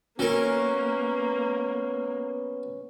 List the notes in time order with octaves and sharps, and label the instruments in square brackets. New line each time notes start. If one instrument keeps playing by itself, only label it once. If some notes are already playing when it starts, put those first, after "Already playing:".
[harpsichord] F#3 A#4 [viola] A#3 [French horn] B3 [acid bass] C#4